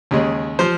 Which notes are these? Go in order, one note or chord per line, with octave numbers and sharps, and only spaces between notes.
D#2 C#3 G#3
F3 C5